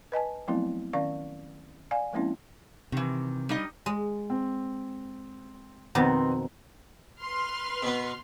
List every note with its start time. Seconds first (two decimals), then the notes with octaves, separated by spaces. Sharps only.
0.12 B4 D#5 G#5 A5
0.48 F3 F#3 A3 B3 C4 E4
0.93 D#3 C#4 D5 F5 C#6
1.91 D5 F5 G#5
2.13 F3 G#3 A#3 C4 C#4 E4
2.92 C3 D#3 E3
3.49 G3 D#4 D#5
3.86 G#3
4.30 C4
5.95 F2 B2 D#3 B3 C4
7.21 B4 C6 F6
7.83 B2 B3